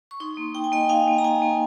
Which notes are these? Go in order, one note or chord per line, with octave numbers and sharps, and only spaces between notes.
C#6
D#4 C6 D#6
A#3
D#4 G5
G#5
A#3 D#5 G5
D#4 F5 G#5
A#3
A#5
D#4 F5 G#5
A#3